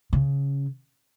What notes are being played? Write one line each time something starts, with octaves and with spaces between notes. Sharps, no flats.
C#3